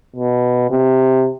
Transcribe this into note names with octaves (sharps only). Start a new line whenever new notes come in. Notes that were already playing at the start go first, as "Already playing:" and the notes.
B2
C3